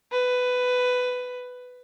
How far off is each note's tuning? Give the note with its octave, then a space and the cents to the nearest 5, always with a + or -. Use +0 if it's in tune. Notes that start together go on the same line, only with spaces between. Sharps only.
B4 +10